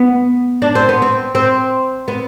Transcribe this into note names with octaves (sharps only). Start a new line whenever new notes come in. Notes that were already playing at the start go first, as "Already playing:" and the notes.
Already playing: B3
D4
C4
B3
C4
C4
B3